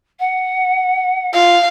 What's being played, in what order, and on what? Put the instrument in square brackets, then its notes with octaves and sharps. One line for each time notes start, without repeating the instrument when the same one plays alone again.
[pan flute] F#5
[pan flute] F4 [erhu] F5